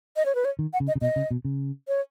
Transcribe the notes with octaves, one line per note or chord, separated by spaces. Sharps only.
D#5
C#5
B4
C#5
D#3
F#5
C#3
D#5
C#3
B2 D#5
C#3
B2
C#3
C#5